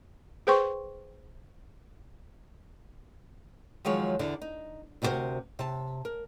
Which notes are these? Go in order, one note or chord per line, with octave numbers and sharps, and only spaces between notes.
G#4 B4 C5 G5 C6 C#6
D#3 F3 F#3 G#3 C#5
E2 D3 D5
D#4
D2 C3 D#4 F#4 A#4 C5
C3 A5
A#4